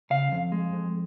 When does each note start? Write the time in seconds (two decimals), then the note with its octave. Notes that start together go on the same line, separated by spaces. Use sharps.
0.10 C#3 F5
0.32 F2
0.52 G#3
0.73 F2